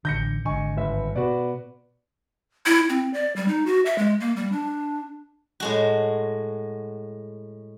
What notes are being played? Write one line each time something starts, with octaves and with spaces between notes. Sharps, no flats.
A1 D3 G6 A#6 C#7
G#1 D3 D#5 G#5 C#6
G1 B4 E5
B2 F#4 B4 D5
E4
C4
D5
G3
D#4
F#4
E5
G#3
A#3
G3
D4
A2 G#3 F#4